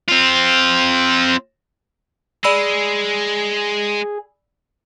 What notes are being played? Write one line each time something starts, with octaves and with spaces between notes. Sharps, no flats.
C4 F4
G#3 G#4 D5 B5 E6